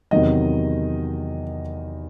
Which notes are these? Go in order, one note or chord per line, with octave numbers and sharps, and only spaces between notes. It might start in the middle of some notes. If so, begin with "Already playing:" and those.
E2 C3 D#3 F#3 D#5